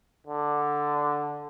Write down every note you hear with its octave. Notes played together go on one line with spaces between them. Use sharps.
D3